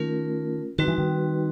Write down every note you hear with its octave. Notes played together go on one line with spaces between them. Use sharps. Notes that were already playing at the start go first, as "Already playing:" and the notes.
Already playing: D#3 A3 C#4 F4 A#4
D#3 G3 C4 D#4 F#4 B4
E3
D#3